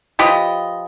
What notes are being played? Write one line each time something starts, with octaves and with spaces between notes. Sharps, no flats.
F3 G4 B4 D#5